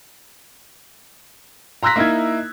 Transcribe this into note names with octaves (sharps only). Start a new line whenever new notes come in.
A#5 C6 E6 F#6 A#6 B6
A#3 D#4 E4 G#6